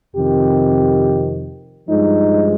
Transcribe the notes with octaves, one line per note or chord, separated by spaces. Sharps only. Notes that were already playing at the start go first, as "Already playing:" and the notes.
F2 C3 D#3 G4
G2 F3 G#3 D#4